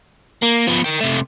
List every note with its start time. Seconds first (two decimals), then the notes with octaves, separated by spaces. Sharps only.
0.43 A#3
0.67 F3 B3
0.85 A#4 G5
1.01 C3 A3